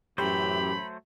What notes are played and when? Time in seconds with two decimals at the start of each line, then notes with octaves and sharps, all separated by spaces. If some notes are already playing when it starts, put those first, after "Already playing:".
0.18 F#2 A2 E3 F#3 A3 G4 C5 B5